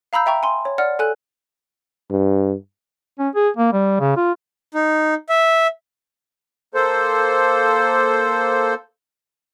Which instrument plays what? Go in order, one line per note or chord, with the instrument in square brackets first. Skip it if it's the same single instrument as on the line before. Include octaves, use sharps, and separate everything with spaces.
[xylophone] F5 A#5 B5 E6 G6
E5 G5 A#5 C#6
G#5 C6
C#5
D5 F#5 F6
A4 G#5 F#6
[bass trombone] G2
[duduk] C#4
G#4
A#3
G3
C#3
F4
[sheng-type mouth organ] D#4
E5
[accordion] A#3 A4 C5